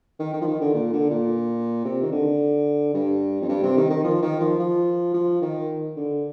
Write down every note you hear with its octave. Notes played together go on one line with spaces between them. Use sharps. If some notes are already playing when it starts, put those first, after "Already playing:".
D#3
D#3
F3
D#3
D3
A#2
D3
A#2
C3
D#3
D3
G2
F2
G2
C3
D#3
D#3
F3
D#3
F3
F3
F3
D#3
D3